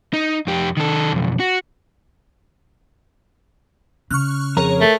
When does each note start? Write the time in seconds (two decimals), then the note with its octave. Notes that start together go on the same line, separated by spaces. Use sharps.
0.13 D#4
0.47 F2 G4
0.77 D#3 A4
1.13 B1 F2
1.40 F#4
4.11 C#3 C#6 F6 F#6
4.57 F2 G#4 A#4 C#5 A#5
4.81 A3